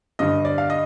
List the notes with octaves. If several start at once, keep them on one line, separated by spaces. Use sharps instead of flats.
G2 D3 G3 D#5
D5
F5
D#5